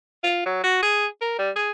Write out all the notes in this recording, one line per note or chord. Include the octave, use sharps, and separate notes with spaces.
F4
F#3
F#4
G#4
A#4
G3
G#4